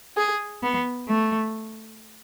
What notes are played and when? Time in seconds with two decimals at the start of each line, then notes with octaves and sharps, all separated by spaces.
0.17 G#4
0.62 B3
1.07 A3